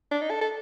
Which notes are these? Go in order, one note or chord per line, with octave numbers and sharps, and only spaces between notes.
D4
D#4
A4
A4